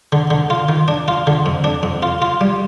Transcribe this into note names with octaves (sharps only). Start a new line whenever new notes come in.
D3
D3
F4
D#3
D4
F4
D3
F2
D4
F2
F4
F4
G3